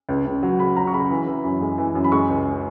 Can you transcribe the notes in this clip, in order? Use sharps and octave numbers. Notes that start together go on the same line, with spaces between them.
C#2
C#2
F#3
C#3 B5
F#3 A#5
C#6
C#3 B5
E3
E3
F#2
G#3
E3
F#2
B5
G#3 C#6
C#2